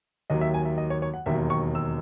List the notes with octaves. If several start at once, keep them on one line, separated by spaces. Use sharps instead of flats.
D#2 D#3 F#3 D#5
E5
G#5
E5
D#5
C#5
C#5
F#5
E1 D#2 D#3 F#3 E5
C#6
E6